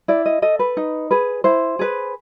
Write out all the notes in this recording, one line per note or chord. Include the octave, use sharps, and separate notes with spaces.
E4 D5
D#5
A4 D#5
B4
D#4
G#4 B4
E4 C5
G#4 B4